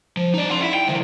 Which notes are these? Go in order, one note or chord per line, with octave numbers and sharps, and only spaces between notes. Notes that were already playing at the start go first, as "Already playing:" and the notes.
F3
D#4 D5
F#5 C6
E4
G5
D#3 F3